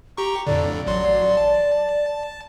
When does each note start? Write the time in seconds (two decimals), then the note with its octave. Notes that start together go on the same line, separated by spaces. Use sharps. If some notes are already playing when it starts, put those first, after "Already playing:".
0.18 G4 A#5 C#6
0.47 F2 A2 D3 D5
0.87 A1 F#3 C6
1.37 A5